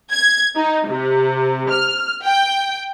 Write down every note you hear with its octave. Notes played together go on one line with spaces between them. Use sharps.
G#6
D#4
C3
F6
G5